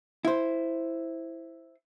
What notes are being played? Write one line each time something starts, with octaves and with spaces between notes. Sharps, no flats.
E4 C5